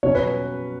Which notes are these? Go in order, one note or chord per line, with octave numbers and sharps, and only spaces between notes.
B2 F#3 C#4 C#5
B4